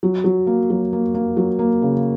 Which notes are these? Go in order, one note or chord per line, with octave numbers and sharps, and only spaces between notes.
F#3
F#3
A#3
F#3
A#3
A#3
F#3
A#3
C#3